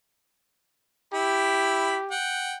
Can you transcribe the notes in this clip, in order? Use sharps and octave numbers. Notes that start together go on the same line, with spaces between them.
E4 G4 B5
F#5 G5